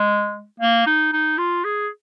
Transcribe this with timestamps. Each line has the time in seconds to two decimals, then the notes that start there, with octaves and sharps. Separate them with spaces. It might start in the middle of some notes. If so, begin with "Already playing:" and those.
Already playing: G#3
0.60 A#3
0.87 D#4
1.13 D#4
1.38 F4
1.64 G#4